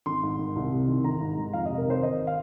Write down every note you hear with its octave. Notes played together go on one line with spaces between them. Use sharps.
G#1 C6
G#2
D#3
C2
C3
D#3
G#1 A#5
G#2
G#3
F2 F5
C3 D#5
A#4
D#3 C5
G#1 D#5
F5